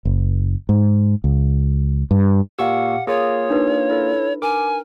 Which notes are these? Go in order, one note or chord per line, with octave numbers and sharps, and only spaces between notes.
F#1
G#2
C#2
G2
A#2 G4 F5 F#5 C#6 E6
A#3 F4 G#4 C#5 D#6
D4 D#4 B4
E4 A4
A#4 G#5 D6